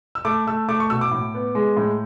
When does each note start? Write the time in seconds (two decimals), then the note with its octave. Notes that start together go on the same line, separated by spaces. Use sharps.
0.15 E6
0.25 A3 D6
0.47 A3 E6
0.68 A3 D6
0.80 C#6
0.90 B2 E6
1.01 D6
1.12 A2
1.34 B3
1.55 G#3
1.77 A2